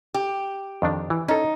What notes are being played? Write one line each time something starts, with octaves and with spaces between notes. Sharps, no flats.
G4
F2 D#3 D4
E3
C#4 D#4 A4